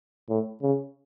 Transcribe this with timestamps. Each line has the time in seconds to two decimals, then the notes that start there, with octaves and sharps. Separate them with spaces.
0.29 A2
0.62 C#3